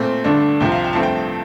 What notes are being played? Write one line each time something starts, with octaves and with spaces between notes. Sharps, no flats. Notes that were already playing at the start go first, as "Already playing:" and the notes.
Already playing: A#2 A3 C4
G2 D3 A3 D4
C2 C3 F3 G5
F5
G5
G2 F3 A3 C4 A5
G5